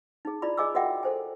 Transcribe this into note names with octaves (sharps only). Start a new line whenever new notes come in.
D#4 G#4
E4 F4 D5 A#5 B5
G#4 D#5 G#5 D6 E6
F#4 A#4 D#5 E5 F#5 G5
A4 C5 G#5